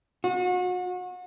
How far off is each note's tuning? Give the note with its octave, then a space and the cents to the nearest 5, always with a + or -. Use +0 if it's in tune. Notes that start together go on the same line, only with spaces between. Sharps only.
F#4 -35